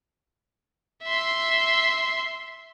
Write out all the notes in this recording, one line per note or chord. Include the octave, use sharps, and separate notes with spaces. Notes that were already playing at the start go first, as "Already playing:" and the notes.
E5 C6